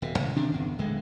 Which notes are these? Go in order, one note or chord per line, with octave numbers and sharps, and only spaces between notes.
D#1 B2
C#2 C#3 E3 G#3
C3 D#3 D4
G1 E2
D1 D3 G#3